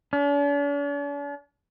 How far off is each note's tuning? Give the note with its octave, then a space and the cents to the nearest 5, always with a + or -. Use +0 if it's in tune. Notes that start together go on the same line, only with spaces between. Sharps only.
D4 -45